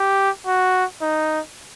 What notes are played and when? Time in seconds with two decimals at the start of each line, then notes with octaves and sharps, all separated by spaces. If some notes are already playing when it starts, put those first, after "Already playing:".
Already playing: G4
0.47 F#4
1.02 D#4